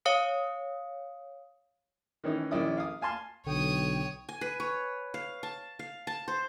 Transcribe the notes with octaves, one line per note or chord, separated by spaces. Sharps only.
C#5 F5 D#6 C#7
D#3 E3 C#4 D#4
A#1 D#3 C#4 E4 D5 D#6
F5 D#6
F5 G#5 A5 C6 F6
B1 D3 C#5 G5 D#6
G#5
B4
C#5
F5
A5
F5
A5
C5